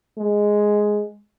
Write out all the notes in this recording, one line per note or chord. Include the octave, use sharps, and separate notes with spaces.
G#3